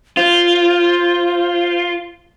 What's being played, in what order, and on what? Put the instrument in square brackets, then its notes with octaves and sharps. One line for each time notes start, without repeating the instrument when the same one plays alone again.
[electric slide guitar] F4 [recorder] C5